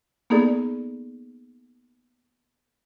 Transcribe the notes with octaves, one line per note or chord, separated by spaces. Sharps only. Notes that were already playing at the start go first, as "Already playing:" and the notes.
A#3 B3 D#4 G#4 A4 D5